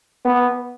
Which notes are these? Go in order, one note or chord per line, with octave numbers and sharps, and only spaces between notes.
B3